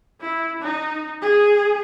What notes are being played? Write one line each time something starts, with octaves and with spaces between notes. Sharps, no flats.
E4
D#4
G#4